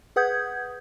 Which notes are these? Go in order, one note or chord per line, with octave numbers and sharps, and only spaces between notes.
G#4 B4 F#5 D#6 G6 G#6